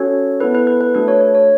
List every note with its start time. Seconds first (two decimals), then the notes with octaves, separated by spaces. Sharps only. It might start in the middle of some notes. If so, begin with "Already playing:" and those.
Already playing: C#4 F#4 A4 C#5
0.40 B3 E4 A4 B4
0.55 B4
0.67 B4
0.81 B4
0.94 A3 D4 F#4 A4 B4
1.08 C#5
1.21 C#5
1.35 C#5